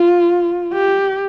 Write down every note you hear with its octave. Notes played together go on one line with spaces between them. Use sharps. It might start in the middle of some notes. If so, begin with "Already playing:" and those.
Already playing: F4
G4